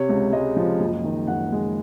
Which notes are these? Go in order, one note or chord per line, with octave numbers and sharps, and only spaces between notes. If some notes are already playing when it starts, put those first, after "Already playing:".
Already playing: C3 C#5
C#2
G#3 D#5
F3
F#1
D#3
F#1 F#5
G#3